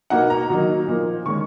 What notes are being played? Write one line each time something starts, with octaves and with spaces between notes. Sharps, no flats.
B2 A#3 D#4 F#5
A#5
D#3 F#3 A#3 D#4
A#2 F3 A#3 D#4
D#3 G#3 C#4 C#6